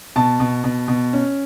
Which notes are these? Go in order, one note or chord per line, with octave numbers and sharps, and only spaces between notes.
B2 A5
B2
B2
B2
C#4